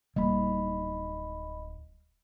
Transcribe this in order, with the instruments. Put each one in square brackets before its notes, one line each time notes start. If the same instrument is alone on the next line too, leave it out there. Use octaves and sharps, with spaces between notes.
[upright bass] D1 D#4 [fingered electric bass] G3 A#3 [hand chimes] D#5 B5